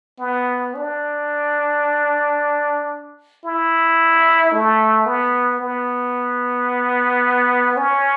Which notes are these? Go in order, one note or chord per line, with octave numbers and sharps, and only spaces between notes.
B3
D4
E4
A3
B3
B3
C#4